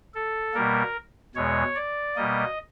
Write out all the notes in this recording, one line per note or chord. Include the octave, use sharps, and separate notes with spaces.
A4
B2 G3 A#3 A#4
E2 B2 G#3 C#5
D5
B2 G3 A#3 D#5